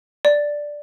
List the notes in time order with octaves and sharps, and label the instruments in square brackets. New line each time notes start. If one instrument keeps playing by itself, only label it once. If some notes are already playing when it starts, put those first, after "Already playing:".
[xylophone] D5